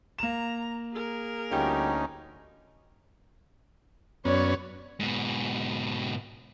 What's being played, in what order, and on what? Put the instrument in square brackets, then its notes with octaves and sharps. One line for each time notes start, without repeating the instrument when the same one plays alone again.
[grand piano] A#3 E7 [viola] A#5
[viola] G#4 A#4
[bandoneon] D2 C#4 D#4 [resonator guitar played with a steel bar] G3 F4 G4
[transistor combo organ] F#2 B3 C#4 [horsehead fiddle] C#5 D5
[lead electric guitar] G#2 B2